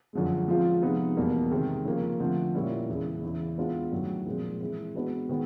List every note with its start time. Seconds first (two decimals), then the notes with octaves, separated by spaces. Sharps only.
0.13 F#2 D3 F3 G#3
0.48 F3 G#3 C4 F4
0.82 C3 F3 G#3 B3 D#4
1.17 E2 B2 G3 A#3
1.51 C3 D#3 G#3 C4
1.85 C#3 F3 A#3
2.20 D3 F3 A3 C4
2.54 A#2 G3 A#3 C#4 E4
2.89 E2 C#3 E3 G#3
3.23 E2 C#3 E3
3.58 G#3 B3 D4 F4
3.92 G2 D#3 F#3 A3
4.26 A#2 F3 G#3 C4
4.61 E3 G#3 C4
4.95 G#3 B3 D4 F#4 B4
5.29 D#3 G#3 B3